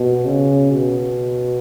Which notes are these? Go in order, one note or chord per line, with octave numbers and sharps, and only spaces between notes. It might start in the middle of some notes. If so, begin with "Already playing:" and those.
Already playing: B2
C#3
B2